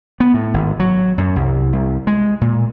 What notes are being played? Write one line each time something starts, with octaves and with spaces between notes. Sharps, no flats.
B3
A2
G#1
F#3
F#2
C2
C2
G#3
A#2